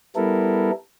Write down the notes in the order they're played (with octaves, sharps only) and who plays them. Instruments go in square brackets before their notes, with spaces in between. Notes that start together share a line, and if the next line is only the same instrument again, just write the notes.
[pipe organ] G3 B3 E4 A4 A#4